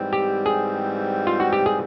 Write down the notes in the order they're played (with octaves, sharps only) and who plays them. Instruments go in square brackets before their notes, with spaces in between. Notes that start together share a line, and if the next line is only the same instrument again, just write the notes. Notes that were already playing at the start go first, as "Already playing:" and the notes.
Already playing: [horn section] G#2 E3 G3 C4
[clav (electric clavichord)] G4
G#4
F4
F#4
G4
G#4